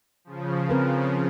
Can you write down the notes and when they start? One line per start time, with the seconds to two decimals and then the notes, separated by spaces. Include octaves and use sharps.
0.25 C#3 F3
0.69 C4 A#4 B4